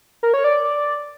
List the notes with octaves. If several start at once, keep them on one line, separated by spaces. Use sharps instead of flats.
A#4
C#5
D5